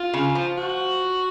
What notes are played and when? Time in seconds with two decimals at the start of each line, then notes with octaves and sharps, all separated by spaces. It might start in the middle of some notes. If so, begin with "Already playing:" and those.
Already playing: F4
0.13 C#3
0.35 F3
0.57 F#4